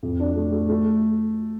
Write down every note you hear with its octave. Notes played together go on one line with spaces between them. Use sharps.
F2
D4
A3
A3
A3